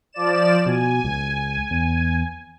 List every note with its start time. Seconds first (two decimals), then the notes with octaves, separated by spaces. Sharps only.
0.12 F3 D5 E7
0.66 B2 G#5
1.04 C#2
1.71 E2